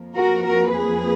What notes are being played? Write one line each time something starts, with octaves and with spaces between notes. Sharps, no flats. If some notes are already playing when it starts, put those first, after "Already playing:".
Already playing: F2 F3 A#3
F#4 A#4
F#4 A#4
G#4 B4